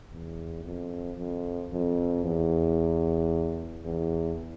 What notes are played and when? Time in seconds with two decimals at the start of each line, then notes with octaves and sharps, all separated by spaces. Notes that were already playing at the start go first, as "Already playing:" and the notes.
0.12 E2
0.64 F2
1.18 F2
1.72 F2
2.25 E2
3.85 E2